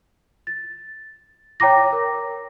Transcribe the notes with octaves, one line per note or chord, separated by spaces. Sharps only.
A6
C#5 G5 A#5 D6 A#6
A#4